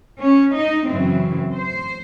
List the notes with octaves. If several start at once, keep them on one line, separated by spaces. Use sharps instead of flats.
C#4
D#4
F#2 C#3 E3 C4
C5